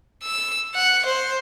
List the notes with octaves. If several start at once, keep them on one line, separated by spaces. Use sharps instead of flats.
E6
F#5
C5